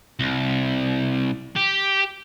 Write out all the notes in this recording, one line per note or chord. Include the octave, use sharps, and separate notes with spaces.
C2
G4